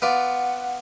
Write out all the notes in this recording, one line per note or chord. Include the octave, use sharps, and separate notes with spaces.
B3 F4 D5 F#5